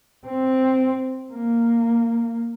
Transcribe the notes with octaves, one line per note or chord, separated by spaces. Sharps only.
C4
A#3